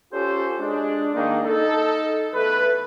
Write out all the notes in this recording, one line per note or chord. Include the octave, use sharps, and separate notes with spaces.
C#4 F4 G4 A4 C5
G#3 D4
D#3 G#3 A#3 D4 D#4
D#4 A4
E2 A3 B4